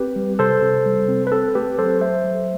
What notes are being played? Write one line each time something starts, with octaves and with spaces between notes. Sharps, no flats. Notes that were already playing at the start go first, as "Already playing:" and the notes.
Already playing: C4 G4 B4
G3
C3 A4 C5
C3
G3
C4
B4
C4 A4
A3 G4 B4
F#3 A4 C5
A3 C5 E5
F#3